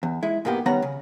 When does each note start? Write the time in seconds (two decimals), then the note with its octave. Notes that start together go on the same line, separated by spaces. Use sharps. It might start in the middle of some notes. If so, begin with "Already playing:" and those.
0.03 E2
0.23 G#3 E4
0.45 G#2 G#3 A#3 B3 G4
0.66 D#3 G3 B3 C#4 F#5 A#5
0.82 C#3